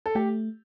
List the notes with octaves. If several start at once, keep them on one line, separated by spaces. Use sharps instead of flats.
A4
A3 G4